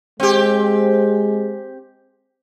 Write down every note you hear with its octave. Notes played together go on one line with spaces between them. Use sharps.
G#3 C4 G4